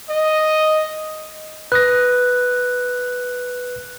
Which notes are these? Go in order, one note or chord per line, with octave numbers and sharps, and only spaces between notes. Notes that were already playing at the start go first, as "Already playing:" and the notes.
D#5
B4 D#6 F#6 A#6